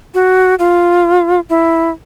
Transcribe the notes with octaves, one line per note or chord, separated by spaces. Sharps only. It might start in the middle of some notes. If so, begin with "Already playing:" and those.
F#4
F4
E4